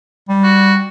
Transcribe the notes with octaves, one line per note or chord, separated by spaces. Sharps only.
G3
F#4